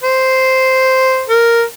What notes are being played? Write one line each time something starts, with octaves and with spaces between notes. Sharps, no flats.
C5
A#4